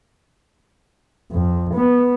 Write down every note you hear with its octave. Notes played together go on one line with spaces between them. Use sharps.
F2
B3